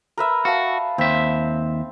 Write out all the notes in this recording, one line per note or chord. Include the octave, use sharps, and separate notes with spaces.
A#4 B4 E5
F#4 F5 A5
D#2 C4 E5